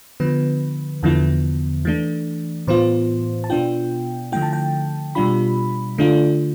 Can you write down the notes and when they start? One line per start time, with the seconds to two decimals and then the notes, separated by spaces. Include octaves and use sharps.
0.20 D3 F3 B3 B4
1.03 E2 D3 F3 B3 E4
1.85 E3 A3 D4
2.67 A2 E3 B3 F4 C5
3.44 A5
3.50 B2 B3 D4 F4 G5
4.32 D3 F3 A3 E4 G5
4.42 A5
4.53 G5
5.15 B2 G3 D4 F4 B5
5.98 D3 A3 D4 F4